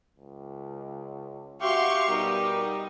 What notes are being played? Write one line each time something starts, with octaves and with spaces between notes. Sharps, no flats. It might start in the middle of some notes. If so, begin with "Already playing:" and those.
C#2
F#4 G4 E5 F5 C6 C#6
B2 G3 D#4 A#4